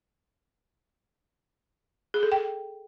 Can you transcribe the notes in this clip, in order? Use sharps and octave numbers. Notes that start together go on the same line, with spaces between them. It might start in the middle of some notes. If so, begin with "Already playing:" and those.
G#4
A4
G5